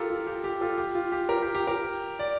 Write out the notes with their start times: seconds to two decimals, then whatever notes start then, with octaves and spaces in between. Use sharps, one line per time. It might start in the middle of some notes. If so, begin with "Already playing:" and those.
Already playing: F4 G4 A4 A#4
0.10 F4
0.27 G4
0.44 G4
0.61 F4 A4
0.78 G4
0.95 F4
1.12 G4
1.29 G4 A#4
1.42 G4
1.55 G4
1.67 G4 A#4
2.19 D5